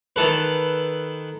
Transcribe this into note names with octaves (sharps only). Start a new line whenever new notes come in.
D#3 A4 B4